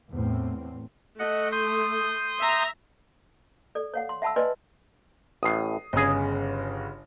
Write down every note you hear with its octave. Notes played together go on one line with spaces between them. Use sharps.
E2 A2 C4
A3 D#5 F#5
C6 D#6 G6
E5 A#5
A4 D5
C#5 F5 F#5
C6
E5 F#5 A5 B5 E6
B4 D5 D#5 G#5 C6
A1 A2 D#6 C7
G1 C#3 G#4 D#5